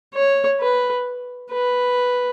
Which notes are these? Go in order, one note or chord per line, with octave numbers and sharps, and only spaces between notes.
C#5
B4
B4